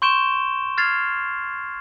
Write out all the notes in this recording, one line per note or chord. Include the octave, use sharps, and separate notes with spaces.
C6 C#6 G6 D7 E7 G7
F6 G#6 A6 C7 F7